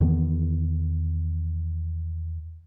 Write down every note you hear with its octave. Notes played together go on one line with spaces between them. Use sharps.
E2 D#3 E3 B3